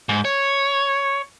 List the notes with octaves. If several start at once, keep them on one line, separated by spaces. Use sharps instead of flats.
G#2
C#5